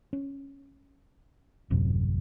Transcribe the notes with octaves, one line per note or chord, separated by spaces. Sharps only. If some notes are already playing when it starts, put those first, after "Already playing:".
C#4
D#1 A1 F#2 C3